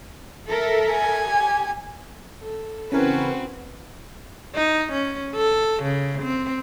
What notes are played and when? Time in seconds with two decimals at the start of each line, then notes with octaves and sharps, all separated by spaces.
0.49 A4 A#4 E5
0.91 G#5
1.25 G4
2.42 A4
2.92 C#3 E3 C4 C#4 F#4 A#4 B4
4.55 D#4
4.93 C#4
5.36 A4
5.83 C#3
6.22 C4